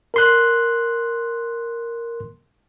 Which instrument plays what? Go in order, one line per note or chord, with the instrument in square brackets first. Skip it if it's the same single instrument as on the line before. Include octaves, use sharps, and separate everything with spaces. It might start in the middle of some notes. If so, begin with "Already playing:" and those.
[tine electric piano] A#4 C6 F#6